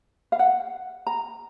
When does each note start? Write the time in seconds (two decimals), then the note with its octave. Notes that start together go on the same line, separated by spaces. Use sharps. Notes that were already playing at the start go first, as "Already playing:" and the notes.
0.32 F5
0.39 F#5
1.07 A#5